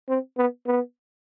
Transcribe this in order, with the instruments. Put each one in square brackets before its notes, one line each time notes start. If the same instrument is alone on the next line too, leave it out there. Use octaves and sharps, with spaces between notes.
[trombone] C4
B3
B3